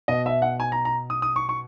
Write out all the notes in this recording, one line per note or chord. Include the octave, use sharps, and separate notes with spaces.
B2 D#5
E5
F#5
G#5
A#5
A#5
D#6
D#6
C#6
C#6